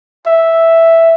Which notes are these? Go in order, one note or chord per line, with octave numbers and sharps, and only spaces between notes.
E5